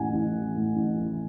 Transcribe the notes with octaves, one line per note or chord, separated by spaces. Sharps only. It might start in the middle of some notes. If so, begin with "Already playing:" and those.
Already playing: A1 A2 E3 F#5 G#5
A1
E3
A2
A1
E3